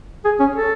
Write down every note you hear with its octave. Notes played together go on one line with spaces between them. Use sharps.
G#4
C#4
A4